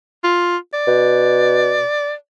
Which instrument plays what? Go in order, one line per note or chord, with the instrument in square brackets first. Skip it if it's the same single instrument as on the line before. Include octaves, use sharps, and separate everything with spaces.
[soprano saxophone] F4
D5
[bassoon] B2